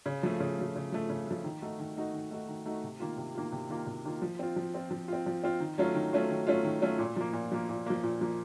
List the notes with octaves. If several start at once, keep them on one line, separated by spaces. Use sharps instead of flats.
C#3
F3 A3
C#3
F3 A3
C#3
F3 A3
C#3
F3 A3
D#3
A3 D#4 F#4
D#3
A3 D#4 F#4
D#3
A3 D#4 F#4
D#3
A3 D#4 F#4
C3
D#3 A#3 F4
C3
D#3 A#3 F4
C3
D#3 A#3 F4
C3
D#3 A#3 F4
F3
C4 F4
F3
C4 F4
F3
C4 F4
F3
C4 F4
D#3
F#3 A3 C#4 F4
D#3
F#3 A3 C#4 F4
D#3
F#3 A3 C#4 F4
D#3
F#3 A3 C#4 F4
A#2
F3 A#3
A#2
F3 A#3
A#2
F3 A#3
A#2
F3 A#3